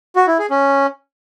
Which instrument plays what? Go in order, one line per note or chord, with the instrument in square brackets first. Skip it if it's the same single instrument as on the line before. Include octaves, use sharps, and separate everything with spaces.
[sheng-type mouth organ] F#4
E4
G#4
C#4